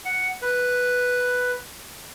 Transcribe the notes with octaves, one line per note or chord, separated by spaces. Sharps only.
F#5
B4